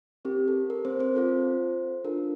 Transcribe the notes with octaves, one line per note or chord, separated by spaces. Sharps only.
C4 G4 A#4
A4
A#4
C4 C5
C4 C5
C4 F4 A4
D4 F4 A4 A#4